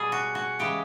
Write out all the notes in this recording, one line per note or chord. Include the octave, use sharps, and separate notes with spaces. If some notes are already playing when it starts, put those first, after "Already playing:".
Already playing: B2 G3 G#4
F#4
F#4
C#3 E3 G#3 G4